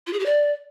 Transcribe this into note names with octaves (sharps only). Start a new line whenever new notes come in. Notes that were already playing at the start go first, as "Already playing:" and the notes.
F4
G#4
G4
D5